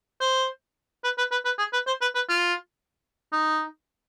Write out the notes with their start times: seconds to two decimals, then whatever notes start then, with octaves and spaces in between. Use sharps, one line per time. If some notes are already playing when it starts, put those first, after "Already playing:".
0.21 C5
1.04 B4
1.18 B4
1.31 B4
1.45 B4
1.59 G#4
1.73 B4
1.87 C5
2.01 B4
2.15 B4
2.29 F4
3.32 D#4